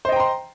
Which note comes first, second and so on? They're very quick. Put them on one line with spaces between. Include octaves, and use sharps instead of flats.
C5 D#5 G5 A#5 C6